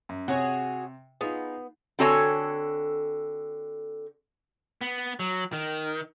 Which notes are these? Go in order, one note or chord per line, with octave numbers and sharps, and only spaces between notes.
F#2
C3 F#4 G#4 C#5
B3 D#4 F4 G#4
D3 C4 F#4 A4 C#5 G#5
B3
F#3
D#3